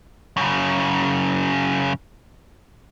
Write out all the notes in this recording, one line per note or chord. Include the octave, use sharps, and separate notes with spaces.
F#2 C#3